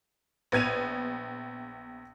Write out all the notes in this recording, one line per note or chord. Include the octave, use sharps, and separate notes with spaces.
A#1 B3 G#6 D#7 F7